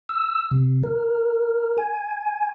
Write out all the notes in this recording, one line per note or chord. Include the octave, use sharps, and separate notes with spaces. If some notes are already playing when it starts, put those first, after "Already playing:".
E6
C3
A#4
G#5